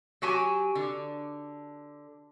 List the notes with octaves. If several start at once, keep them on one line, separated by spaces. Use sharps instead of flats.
F#3 F#4 G4 G#5
D3